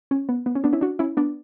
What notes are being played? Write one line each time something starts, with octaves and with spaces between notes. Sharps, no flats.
C#4
B3
B3
C#4
B3 D4
C#4 E4
D4 F#4
C#4 E4
B3 D4